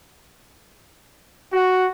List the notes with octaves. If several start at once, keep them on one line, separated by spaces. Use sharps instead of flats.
F#4